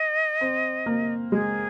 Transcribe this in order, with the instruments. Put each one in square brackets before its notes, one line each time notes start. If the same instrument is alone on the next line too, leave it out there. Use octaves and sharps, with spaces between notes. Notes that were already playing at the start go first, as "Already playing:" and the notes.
Already playing: [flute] D#5
[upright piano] C4
A#3
[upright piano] G#3 [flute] G#4